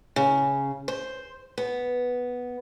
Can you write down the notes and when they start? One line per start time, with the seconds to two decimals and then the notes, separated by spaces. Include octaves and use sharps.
0.16 C#3
0.88 C5
1.58 B3